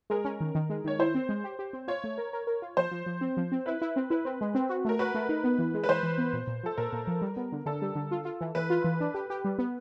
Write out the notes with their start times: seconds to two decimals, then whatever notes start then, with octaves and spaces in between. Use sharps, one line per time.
0.10 G#3 A#4
0.25 C#4
0.40 D#3
0.55 D#3
0.69 G#3
0.85 D#3 C#5
0.99 E4 C5
1.15 C4
1.29 G#3
1.44 G4
1.59 G4
1.73 C4
1.88 F4 C#5
2.04 A3
2.18 A#4
2.33 A#4
2.47 A#4
2.62 F4
2.77 F3 C5
2.91 F3
3.06 F3
3.21 C4
3.37 F3
3.52 C4
3.66 E4 B4
3.82 E4
3.96 C4
4.10 E4 B4
4.25 C4
4.41 G#3
4.55 C4
4.69 F#4
4.85 A3 A#4
4.99 F#4 B4
5.15 A3
5.29 D#4
5.44 B3
5.59 E3
5.74 G#3
5.84 B4
5.89 E3 C5
6.03 E3
6.18 B3
6.33 A#2
6.47 A#2
6.63 F3 A4
6.78 A#2 A#4
6.93 A#2
7.07 F3
7.22 G3
7.37 B3
7.52 D3
7.66 D3 A4
7.82 G3
7.95 D3
8.11 F4
8.25 F4
8.41 E3
8.55 E3 B4
8.70 F4
8.84 E3
9.00 D4
9.14 G4
9.30 G4
9.45 G3
9.59 B3